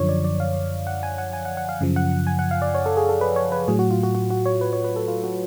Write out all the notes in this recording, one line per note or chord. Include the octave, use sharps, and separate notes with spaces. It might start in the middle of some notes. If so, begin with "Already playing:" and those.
Already playing: F#2 D3 F3 C#5
D5
D5
F5
F#5
G#5
F#5
G#5
F#5
F#5
F5
F#2 C#3 F3
F#5
G#5
F#5
F5
D5
C#5
A4
G#4
A4
B4
C#5
B4
A2 F#3 G#4
F#4
F4
F#4
F#4
F#4
C#5
B4
C#5
B4
A4
F4
F#4